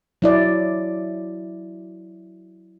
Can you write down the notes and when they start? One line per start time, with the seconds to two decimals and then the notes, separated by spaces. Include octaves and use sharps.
0.22 F#3 E4 D5